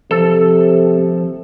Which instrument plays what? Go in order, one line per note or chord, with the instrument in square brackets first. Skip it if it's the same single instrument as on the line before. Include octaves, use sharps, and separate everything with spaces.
[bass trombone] C3 [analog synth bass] F3 [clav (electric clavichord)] A4